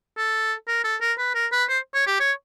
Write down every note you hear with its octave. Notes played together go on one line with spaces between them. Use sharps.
A4
A#4
A4
A#4
B4
A#4
B4
C5
C#5
G4
C#5